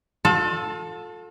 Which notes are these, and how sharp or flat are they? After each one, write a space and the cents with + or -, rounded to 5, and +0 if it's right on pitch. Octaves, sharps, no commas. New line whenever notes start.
F4 +45 A4 +0